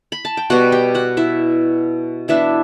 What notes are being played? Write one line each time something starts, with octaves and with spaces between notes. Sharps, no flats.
B5
A5
G5
B2 G3 B3 F#4 F#5
G4 G5
F#4 F#5
E4 E5
E3 B3 D4 E4 E5